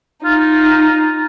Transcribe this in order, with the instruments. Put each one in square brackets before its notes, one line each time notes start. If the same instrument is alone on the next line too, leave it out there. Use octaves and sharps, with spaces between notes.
[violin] D#4 [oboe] F4